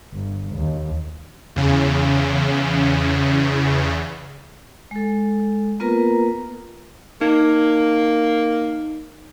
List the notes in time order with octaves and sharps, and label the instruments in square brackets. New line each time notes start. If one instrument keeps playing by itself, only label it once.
[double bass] G1
D#2
[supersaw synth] E2 C#3
[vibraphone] G#3 A4
A#3 B3 F4 A#4 B4 A#5
[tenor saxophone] A#3 [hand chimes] D#4